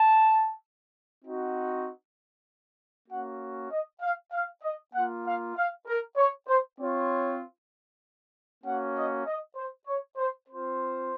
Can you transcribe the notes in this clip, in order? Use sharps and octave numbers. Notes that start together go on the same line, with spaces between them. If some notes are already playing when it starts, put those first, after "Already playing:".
Already playing: A5
C4 D#4 F#4
A#3 C#4 F#4 F#5
D#5
F5
F5
D#5
A#3 F4 F#5
F5
F5
A#4
C#5
C5
C4 F4 C#5
A#3 C#4 F#4 F#5
D#5
D#5
C5
C#5
C5
C4 F4 C5